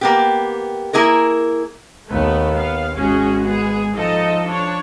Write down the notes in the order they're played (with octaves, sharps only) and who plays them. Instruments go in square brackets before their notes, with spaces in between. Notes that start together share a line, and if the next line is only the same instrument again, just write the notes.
[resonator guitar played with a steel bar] A#3 B3 G4
A#3 E4 G#4 A#4
[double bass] D#2 [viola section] A3 B3
[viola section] B3 F5
[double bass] G#1 G#3 [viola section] C#4 F#4 G#4
[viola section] B3 G#4
[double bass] F3 [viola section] D#4 A4 D#5
[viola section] D4 C#5